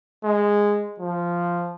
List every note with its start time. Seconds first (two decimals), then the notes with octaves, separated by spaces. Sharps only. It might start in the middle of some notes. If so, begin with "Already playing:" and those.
0.24 G#3
1.00 F3